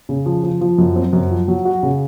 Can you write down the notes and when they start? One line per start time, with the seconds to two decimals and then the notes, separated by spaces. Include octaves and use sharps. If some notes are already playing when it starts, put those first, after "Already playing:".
0.09 C#3
0.26 F3
0.44 F3
0.61 F3
0.78 F#2
0.96 C4
1.13 F#2
1.31 F3
1.48 F#3
1.65 F#4
1.83 C#3